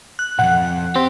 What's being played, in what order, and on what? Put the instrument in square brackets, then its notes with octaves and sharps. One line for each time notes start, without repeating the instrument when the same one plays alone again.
[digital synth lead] F#6
[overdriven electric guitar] B1 F2 [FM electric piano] F#5
[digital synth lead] C4 [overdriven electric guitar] G4